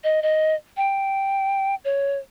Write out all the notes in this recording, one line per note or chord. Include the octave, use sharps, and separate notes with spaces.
D#5
D#5
G5
C#5